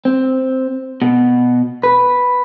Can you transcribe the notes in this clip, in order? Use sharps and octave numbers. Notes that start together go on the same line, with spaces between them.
C4
B2
B4